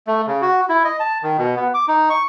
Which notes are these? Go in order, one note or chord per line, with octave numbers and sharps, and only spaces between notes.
A3
C#3
F#4
E4
D#5
A5
D#3
B2
B3
D6
D#4
C#6